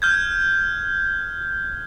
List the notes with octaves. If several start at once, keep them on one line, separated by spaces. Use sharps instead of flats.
F6 G6 G#6